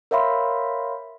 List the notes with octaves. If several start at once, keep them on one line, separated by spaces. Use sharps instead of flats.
A#4 C#5 E5 F5 B5 C6